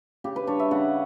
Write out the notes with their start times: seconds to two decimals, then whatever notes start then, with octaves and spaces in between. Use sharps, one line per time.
0.24 C#3 G4
0.36 B4
0.47 G3 D4 C#5
0.59 E5
0.71 C#3 F#5